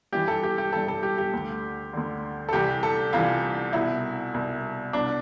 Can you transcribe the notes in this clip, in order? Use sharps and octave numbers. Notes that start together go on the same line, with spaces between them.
G2 E3 G4
A4
G4
G4
G2 E3 A4
A4
G4
G4
D2 D3
D2 D3
A4
C2 C3 E3 G4
A4
C2 C3 E3 F4
C2 B2 E4
C2 B2
C2 B2 D4